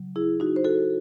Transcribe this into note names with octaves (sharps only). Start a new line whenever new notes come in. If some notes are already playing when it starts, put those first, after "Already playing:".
Already playing: C#3 F#3
E4 G#4
D#4 F#4
C5
F#4 A4